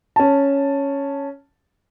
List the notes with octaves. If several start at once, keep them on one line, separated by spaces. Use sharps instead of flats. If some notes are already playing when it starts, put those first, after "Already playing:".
C#4 A5